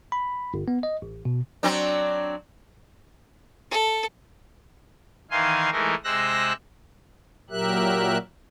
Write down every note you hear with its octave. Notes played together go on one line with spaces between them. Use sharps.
B5
G1
B3
D#5
A1
B2
F#3 C4 D4
A4
D#3 E3 D#4 F5 G#5 C6
E3 G#3 A3 D#4 A#4
C3 G#3 C5 E6 F#6 A#6
A#2 F#3 G4 A#4 E5 F#6